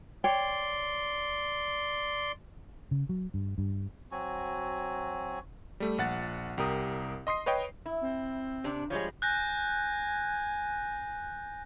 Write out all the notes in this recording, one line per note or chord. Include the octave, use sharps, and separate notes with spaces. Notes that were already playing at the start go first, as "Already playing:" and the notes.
C#5 D5 G5 C6
C#3
F#3
G2
G2
F#3 C4 F#4 G#5
G3 A3
A#1 F#5 A6
C2 G4 A#4 D#6
D#5 C6 D#6 C7
B4 C#5 D#5 G5
E4
C4
C3 D4
F3 G3 G#3 C#5
G#5 F#6 G6 A#6